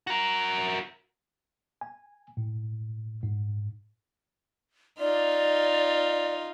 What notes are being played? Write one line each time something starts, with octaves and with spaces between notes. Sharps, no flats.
F#4 A#4
G#5
A2
G#2
D#4 F4 D5